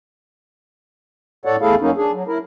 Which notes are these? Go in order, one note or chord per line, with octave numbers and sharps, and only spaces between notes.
A2 A4 C#5 D5 F#5
E2 A3 E4 G#4 A4 F5
F#2 F#3 A#3 C#4 D#4
D4 G#4
F#3
E4 A#4